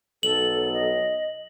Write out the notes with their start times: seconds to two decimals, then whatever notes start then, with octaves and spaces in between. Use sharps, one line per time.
0.23 B1 A4 F#7
0.74 D#5